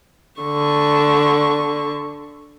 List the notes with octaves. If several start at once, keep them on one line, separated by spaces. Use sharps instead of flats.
D3 C#6